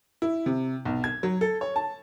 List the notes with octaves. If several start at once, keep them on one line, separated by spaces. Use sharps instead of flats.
E4
C3
B1
G#6
F#3
A4
C#5
A5